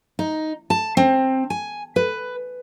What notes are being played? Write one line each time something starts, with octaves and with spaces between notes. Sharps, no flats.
D#4
A5
C4
G#5
B4